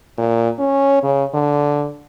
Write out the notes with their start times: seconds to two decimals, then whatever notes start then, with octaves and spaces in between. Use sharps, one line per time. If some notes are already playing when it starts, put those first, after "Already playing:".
0.18 A#2
0.59 C#4
1.03 C#3
1.34 D3